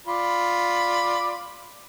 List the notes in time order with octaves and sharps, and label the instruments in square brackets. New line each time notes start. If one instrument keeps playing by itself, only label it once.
[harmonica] F4 D5 B5